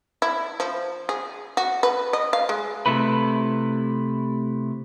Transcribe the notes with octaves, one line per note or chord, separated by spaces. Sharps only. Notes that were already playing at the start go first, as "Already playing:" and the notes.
E4
F3
G#4
F#4
B4
D#5
F5
G#3
C3 A3 E4 B4